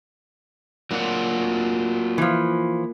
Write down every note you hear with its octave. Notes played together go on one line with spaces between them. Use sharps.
A#2 F#3 D4 F#4
E3 F3